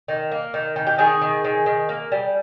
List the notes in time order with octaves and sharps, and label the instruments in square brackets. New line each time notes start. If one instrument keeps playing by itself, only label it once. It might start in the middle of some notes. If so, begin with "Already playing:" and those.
[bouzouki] D#3
A#3
D#3
D#3
G4
D#3 G#4
D#3
D#3
D#3
A#3
G3